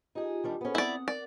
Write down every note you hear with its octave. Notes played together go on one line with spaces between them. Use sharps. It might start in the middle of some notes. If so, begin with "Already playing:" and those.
D#4 F4 G4 G#4
D#3 G3 D4
B3 C#4 G#4 A4 C5
C4 E4 D5 F#5 D#6
A#4 D5